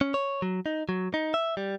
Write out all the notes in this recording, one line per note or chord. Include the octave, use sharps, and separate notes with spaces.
C#4
C#5
F#3
D#4
F#3
D#4
E5
G3